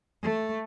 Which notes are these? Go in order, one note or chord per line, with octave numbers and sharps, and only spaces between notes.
A3